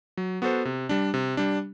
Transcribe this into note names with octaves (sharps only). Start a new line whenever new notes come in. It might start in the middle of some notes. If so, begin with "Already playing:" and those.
F#3
B3 F#4 A4 C5
C3
G3 D4
C3
G3 D4